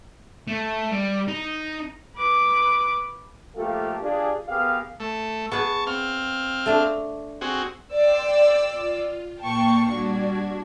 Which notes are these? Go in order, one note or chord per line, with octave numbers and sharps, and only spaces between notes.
A3
G3
D#4
B4 D6
F3 A3 A#3 G4 A4 F5
D4 F4 G4 G#4
B3 G4 G#4 A#4 F5
A3
B3 G#4 B4 A5 C#6
C4 F5
A3 D4
C4 F#4 G#4
D5 G5 C6 E6
F4
A#2 A#3 G5 A5 C#6 C7
G3 D4 F#4 G#6